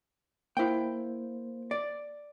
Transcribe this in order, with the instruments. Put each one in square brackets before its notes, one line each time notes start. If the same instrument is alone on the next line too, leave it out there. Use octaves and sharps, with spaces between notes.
[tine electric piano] A#3 C5 [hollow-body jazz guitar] E4 G5
[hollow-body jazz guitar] D5